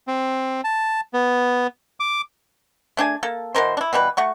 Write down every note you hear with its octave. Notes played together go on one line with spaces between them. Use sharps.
C4
A5
B3
D6
A3 D4 G#4 G#5
A#3 A4
B2 E3 A#4 C5
D4 E4
B2 E3 G3 B4
A3 F#4 C#6